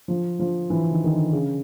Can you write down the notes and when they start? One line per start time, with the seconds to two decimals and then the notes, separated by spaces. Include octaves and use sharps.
0.08 F3
0.39 F3
0.70 E3
0.91 D#3
1.04 D#3
1.11 D3
1.32 C#3